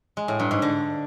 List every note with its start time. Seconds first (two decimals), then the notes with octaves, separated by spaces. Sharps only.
0.17 G#3
0.28 A2
0.40 G2
0.51 G#2
0.62 D3